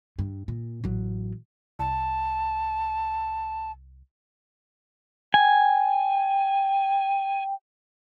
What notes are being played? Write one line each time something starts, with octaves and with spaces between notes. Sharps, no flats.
G2
A#2
A1 F#3
C2 A5
G5 G#5